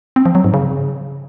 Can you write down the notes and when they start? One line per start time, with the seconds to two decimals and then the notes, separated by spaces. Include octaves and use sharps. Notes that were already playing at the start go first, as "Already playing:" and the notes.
0.16 C4
0.26 F3
0.35 F#3
0.44 G#2
0.54 C#3